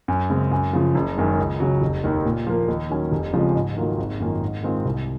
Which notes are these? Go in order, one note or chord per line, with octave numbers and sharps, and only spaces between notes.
F#2
C#3 G#3 C4
F#2
C#3 F3
F#1
F#2 D#3 G#3
C#2
C#3 F#3
F1
D#2 D#3
A#2
F3 A#3
D#2
D#3 F#3 C#4
F1
F2 C#3 F3 G#3
G#2
D#3 F#3 A#3 F4
G#1
F#2 D#3 A#3 F4
G#2
D#3 G#3 C4 F4
C2